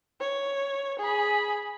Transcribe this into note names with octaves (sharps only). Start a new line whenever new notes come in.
C#5
G#4 B5